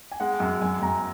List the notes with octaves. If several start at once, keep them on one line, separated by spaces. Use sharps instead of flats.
G#5
G#3 F#5
F#2
F#2 G#5
F#2 A#5